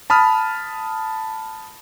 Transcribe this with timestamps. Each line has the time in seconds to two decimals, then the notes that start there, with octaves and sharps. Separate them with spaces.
0.10 A5 B5 D#6 F6